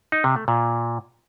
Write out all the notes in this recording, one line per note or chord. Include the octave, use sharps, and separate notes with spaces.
D#4
C3
A3
A#2